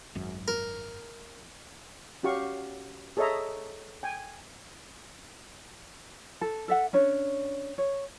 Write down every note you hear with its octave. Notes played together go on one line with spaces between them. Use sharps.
G#1 F#2
A#4
C#4 F#4 G4 F5 C#6
G#4 A4 C#5 D#5 E5 A#5
G5 G#5
A4
A4 E5 F#5
C#4 D4 C#5
C#5